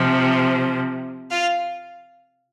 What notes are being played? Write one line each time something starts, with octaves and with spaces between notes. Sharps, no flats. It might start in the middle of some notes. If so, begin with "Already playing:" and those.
Already playing: C3 F3
F4 F5